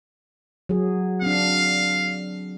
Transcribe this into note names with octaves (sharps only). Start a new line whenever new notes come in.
F#3 G#4
C4 D4 F5